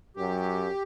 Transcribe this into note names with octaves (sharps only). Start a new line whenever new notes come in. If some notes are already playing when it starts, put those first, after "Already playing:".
F#2 F#3 G4